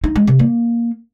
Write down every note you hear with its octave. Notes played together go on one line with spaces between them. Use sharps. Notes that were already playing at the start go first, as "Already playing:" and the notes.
D#4
G#3
C3
A#3